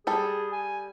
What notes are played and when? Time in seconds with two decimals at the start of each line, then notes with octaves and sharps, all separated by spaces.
0.07 G3 G#4 A4
0.53 G#5